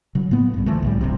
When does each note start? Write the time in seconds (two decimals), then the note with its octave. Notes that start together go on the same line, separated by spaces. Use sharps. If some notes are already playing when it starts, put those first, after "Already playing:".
0.15 C#3 F#3
0.31 A2 A#3 B3
0.54 C2 G2
0.66 D3 E3 F3 A3
0.83 C2 A2 G3
1.01 D#1 D2 C3